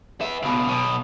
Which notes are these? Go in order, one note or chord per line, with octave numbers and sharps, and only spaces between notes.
B3 E5
C#2 B2
B1 B2